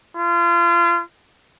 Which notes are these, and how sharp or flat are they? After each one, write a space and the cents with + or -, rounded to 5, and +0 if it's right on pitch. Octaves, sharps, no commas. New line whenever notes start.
F4 -30